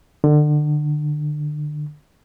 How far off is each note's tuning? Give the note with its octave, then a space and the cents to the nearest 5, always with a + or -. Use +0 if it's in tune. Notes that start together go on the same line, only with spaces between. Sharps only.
D3 +30